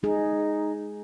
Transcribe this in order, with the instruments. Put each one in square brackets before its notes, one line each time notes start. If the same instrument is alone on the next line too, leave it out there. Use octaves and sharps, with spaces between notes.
[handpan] G#3 G#4 [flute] D#4